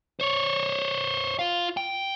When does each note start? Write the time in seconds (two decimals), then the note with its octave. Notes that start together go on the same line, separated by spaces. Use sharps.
0.20 C5 C#5
1.39 F4 F5
1.77 G5